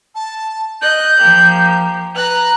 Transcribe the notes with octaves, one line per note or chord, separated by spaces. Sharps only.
A5
D#5 F#6 G6
F3 A#3 G4
B4 A#5 F#6